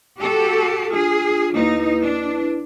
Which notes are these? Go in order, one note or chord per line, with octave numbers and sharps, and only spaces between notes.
F#4 G4 A4
D4 F4 G#4
D#2 D#4 E4 B4
D4